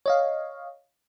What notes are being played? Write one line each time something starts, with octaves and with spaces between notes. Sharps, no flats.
C#5 D#5 F5